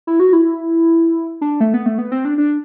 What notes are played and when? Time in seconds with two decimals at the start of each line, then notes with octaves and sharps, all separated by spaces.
0.07 E4
0.20 F#4
0.33 E4
1.41 D4
1.61 A3
1.74 B3
1.86 A3
1.98 B3
2.12 C4
2.25 D4
2.38 D4